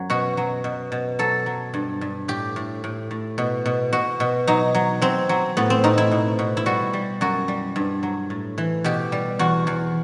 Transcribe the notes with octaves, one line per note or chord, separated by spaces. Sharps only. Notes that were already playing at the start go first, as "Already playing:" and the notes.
Already playing: F#2 F#3
B2 F#4
F#3
B2
B2
F#3 A4
F#3
G2
G2
A2 G4
A2
A2
A2
B2
B2
B2 F#4
B2
F#3 D#4
F#3
F#3 C4
F#3
A2 B3
C4
A2 D#4
E4
B2
B2
E4
G3 F#4
G3
F#2 F#4
G3
G2
F#3
A2
E3
B2 G4
G3
E2 F#4
E2